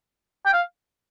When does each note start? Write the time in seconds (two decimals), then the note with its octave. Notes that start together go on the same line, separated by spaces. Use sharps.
0.46 G5
0.53 F5